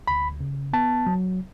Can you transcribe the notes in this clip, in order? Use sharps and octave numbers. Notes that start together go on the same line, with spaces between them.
D2 B5
C#3
B3 A5
F#3